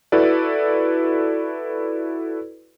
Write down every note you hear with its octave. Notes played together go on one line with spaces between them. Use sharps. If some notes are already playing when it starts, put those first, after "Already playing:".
E4 F#4 A4 B4 D5